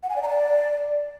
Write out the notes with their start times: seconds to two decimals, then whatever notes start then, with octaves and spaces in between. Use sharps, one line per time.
0.03 F#5
0.10 G#5
0.16 D5
0.23 A#5
0.29 D5